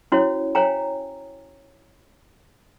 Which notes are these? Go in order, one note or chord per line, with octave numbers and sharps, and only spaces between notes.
C#4 E4 F#4 C5 C#5
C5 C#5 F5 G5 G#5 A#5